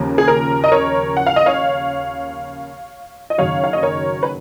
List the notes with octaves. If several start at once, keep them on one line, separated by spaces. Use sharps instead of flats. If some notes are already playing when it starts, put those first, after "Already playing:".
Already playing: D#2 C#3 F3 A#3
G#4
A#4
D#5
A#4 C#5
F#5
F5
D#5
C#5 F5
D#5
F#1 F#2 D#3 F#3 C#5 F5
F5
D#5
A#4 C#5
B4